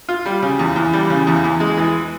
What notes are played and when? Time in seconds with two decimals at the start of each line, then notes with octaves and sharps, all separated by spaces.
0.08 F4
0.26 G3
0.42 C#3
0.59 E2
0.76 E2
0.93 G3
1.10 C#3
1.27 E2
1.44 E2
1.60 G#3
1.77 E3